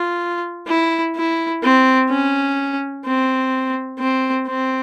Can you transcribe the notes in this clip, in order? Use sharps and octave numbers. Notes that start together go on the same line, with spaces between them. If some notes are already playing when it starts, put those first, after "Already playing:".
Already playing: F4
E4
E4
C4
C#4
C4
C4
C4